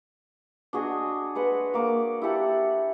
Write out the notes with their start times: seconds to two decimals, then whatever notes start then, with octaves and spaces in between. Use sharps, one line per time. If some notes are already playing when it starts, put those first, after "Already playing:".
0.73 D4 F#4 G#4 D#5
1.35 G#3 B4 F#5
1.74 A#3 D6
2.22 E4 G4 A4 F#5